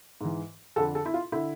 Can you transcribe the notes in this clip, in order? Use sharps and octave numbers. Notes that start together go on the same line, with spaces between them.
G#2 E3
F2 D3 A4
A4
E4
F4
D3 E4